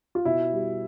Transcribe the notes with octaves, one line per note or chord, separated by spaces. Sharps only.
F4
B2 E4
G3